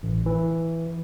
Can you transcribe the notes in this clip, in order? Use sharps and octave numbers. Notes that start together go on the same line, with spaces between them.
A1
E3